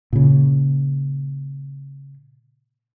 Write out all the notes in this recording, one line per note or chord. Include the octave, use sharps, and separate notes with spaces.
A#2 C#3